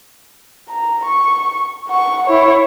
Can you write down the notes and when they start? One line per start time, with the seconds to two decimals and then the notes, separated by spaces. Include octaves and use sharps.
0.69 A#5
1.05 C#6
1.88 F#5 C#6
2.26 E4 C#5